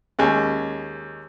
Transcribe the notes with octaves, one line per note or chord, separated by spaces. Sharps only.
D#2 G#3 C#4